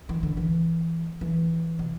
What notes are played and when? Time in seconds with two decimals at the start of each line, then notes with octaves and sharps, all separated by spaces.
0.09 E3
0.23 D3
0.37 E3
1.21 E3
1.79 C3